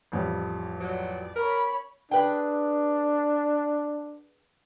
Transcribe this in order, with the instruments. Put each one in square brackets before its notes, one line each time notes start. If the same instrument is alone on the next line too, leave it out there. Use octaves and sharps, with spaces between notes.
[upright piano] A1 F2 G3
[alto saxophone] F#3 [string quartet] D5
[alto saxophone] A#4 [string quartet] C#5 B5
[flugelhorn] D4 [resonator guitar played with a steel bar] G#4 B4 G5